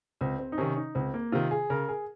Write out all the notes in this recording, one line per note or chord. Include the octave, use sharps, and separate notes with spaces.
C#2 C4
C4
D#4
C3 D#3 C#4
D#4
C#2 C4
A#3
C3 D#3 F4
G#4
C#3 A#4
G#4